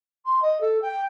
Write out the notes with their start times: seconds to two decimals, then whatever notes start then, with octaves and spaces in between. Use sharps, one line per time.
0.25 C6
0.41 D#5
0.60 A4
0.81 G5